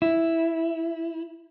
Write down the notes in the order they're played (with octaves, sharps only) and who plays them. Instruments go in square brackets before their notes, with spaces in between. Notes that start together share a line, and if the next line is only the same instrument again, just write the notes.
[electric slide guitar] E4